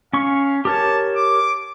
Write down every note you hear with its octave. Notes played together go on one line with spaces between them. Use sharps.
C#4 F5 C#6
G4 A#4 C#5 A5
D6